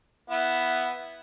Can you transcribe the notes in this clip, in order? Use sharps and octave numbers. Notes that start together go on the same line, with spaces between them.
B3 E4